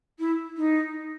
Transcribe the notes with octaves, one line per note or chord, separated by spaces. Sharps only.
E4
D#4